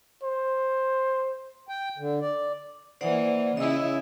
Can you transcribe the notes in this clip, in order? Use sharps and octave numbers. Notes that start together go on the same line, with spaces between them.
C5
G5
D3
D5
E3 A#3 C5 D5 F#5
C#3 C#4 E4 D#5 E6